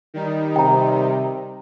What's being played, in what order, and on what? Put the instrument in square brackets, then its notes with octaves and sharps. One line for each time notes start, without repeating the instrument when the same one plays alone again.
[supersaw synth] D#3 G3 D#4
[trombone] C3 [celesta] G5 A#5